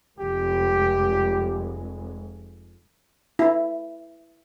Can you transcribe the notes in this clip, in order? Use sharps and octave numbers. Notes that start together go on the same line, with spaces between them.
F1 F2 G#3 G4
E4